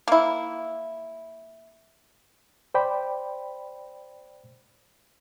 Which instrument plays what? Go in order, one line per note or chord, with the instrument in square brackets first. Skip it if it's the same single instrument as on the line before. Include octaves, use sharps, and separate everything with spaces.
[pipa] A#3 E4
[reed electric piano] C5 D5 G5 B5